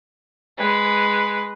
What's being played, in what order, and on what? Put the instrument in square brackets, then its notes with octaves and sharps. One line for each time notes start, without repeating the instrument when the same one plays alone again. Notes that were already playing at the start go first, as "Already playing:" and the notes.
[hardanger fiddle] G#3 B4